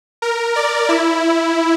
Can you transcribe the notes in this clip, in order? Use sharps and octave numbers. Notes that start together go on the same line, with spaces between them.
A#4
D5
E4